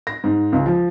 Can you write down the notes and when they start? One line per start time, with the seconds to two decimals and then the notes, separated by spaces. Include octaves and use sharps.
0.07 A#6
0.24 G#2
0.52 C#2
0.66 F3